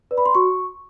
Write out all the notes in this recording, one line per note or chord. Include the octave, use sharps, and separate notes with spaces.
B4 D5
B5
C6
F#4 C#6